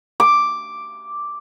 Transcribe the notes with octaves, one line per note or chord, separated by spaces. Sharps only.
D6